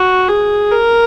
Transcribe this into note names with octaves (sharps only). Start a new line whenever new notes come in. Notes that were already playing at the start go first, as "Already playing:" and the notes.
Already playing: F#4
G#4
A#4